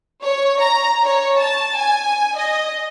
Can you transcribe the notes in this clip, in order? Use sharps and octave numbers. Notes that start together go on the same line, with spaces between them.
C#5
A#5
C#5
A5
G#5
D#5